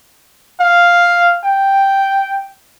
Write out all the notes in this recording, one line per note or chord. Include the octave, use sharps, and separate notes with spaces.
F5
G5